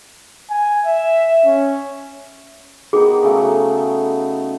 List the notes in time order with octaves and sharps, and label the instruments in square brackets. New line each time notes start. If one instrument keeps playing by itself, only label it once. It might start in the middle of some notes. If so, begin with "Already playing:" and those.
[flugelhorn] G#5
E5
C#4
[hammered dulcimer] D#3 B3 D#4 [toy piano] G#4
[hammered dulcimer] C#3 F#3 A3